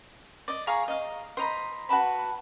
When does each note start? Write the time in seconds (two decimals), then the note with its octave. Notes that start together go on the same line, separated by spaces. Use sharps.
0.48 D5 D#5
0.67 G#4 F5 A#5 C#6
0.88 D#5 F5
1.37 C5 D#5 A#5 B5
1.89 F#4 B4 A5 B5